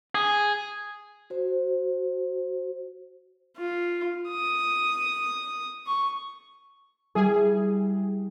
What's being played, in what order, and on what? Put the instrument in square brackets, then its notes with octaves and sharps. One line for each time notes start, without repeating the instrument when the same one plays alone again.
[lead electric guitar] G#4
[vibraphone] F#4 C5
[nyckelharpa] F4
D#6
C#6
[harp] G3 E4 [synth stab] G#4